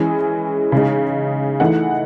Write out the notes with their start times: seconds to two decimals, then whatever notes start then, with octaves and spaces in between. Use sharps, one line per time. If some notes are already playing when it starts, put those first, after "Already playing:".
Already playing: E3 G#3 C#4 G#4
0.72 C#3 G#3 D#4
1.60 E3 A3 D#4 F#5